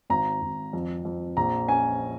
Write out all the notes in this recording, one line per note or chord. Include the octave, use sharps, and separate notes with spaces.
G#1 A#5
G#1
F2
F2
A#1 A#5
C#4 G#5